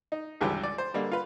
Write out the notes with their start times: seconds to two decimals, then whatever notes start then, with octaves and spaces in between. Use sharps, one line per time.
0.12 D#4
0.41 G#1 C#2 G2 E3 G4
0.63 D5
0.78 C5
0.94 D3 G3 G#3 A#3
1.11 F4 B4